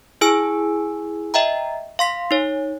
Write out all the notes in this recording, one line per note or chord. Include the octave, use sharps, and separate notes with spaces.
E4 G#4 G#5 E6 D7
D#5 E5 G5 A#5
F5 C6 B6
D#4 C#5